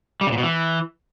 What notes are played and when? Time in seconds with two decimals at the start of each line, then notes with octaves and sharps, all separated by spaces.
0.21 G3
0.27 C#3
0.32 A#2
0.38 B2
0.43 E3